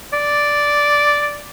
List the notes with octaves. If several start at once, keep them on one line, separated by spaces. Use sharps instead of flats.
D5